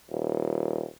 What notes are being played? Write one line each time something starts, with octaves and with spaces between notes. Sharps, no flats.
D#1